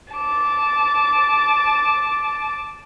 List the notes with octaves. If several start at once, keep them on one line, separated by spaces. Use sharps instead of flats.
A5 D6